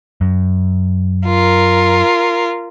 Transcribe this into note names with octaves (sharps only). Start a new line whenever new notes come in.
F#2
F4 A#4